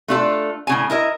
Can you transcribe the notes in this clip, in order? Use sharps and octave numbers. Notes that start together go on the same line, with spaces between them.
A3 D4 F4 G#4 A4
A2 C#3 G#5
E4 A#4 D#5 E5